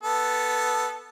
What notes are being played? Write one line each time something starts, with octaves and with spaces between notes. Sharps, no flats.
B3 A4